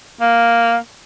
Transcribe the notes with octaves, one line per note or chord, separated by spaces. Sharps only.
A#3